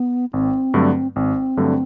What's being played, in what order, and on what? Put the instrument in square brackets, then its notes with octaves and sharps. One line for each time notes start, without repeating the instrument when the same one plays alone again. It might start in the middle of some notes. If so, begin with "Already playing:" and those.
Already playing: [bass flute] B3
[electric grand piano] G#1 [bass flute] C4
[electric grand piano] G2 D3 F#3 A3
[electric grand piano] G#1 [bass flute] C4
[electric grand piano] G2 D3 F#3 A3